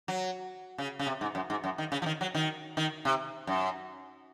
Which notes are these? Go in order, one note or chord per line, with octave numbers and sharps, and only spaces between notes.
F#3
C#3
C#3
C3
G#2
F#2
G#2
F#2
D#3
C#3
F3
D#3
F#3
D#3
D#3
C3
F#2